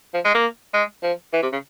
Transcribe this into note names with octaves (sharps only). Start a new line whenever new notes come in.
F3
G#3
A#3
G#3
F3
E3
C3
C#3